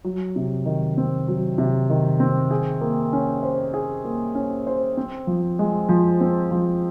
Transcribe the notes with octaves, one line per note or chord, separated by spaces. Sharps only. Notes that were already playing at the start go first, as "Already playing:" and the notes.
F#3
C3
D#3
C4
F#3
C3
D#3
C4
G#4
A#3
C#4
C5
G#4
A#3
C#4
C5
C4
F3
G#3
F3
C4
F3